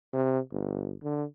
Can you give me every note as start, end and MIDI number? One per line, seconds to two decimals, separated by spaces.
0.13 0.39 48
0.52 0.94 31
1.03 1.24 50